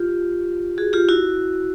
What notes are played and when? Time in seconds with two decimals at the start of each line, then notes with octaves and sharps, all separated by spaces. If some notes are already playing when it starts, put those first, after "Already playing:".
Already playing: F4 G4
0.78 F#4 G#4
0.93 F4 G4
1.09 E4 F#4